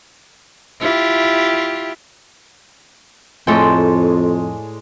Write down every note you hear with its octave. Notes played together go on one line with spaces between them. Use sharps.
E4 F4 G4
F2 A2 G#3 A4 D5 G5 D#6